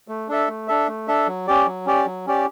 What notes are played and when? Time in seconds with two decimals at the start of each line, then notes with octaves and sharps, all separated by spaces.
0.08 A3
0.28 D4 A4 E5
0.48 A3
0.68 D4 A4 E5
0.88 A3
1.08 D4 A4 E5
1.27 F#3
1.47 C#4 G4 D5
1.67 F#3
1.86 C#4 G4 D5
2.06 F#3
2.27 C#4 G4 D5